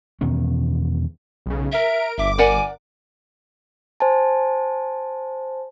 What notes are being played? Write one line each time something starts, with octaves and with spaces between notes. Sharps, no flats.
E2 B2 D#3 C#4
B1 C#3
A#4 E5 D7
G1 E5 D6
A#4 D5 F#5 G#5
C5 G#5 A5